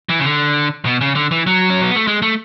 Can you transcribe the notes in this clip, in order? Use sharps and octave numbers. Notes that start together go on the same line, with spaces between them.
E3
C#3
D3
B2
C#3
D3
E3
F#3
C#4
B3
A3
G#3
A3